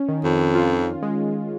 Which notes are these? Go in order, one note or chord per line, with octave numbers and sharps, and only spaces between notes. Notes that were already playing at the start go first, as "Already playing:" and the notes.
Already playing: C#4
D#3
F2
F4
G#3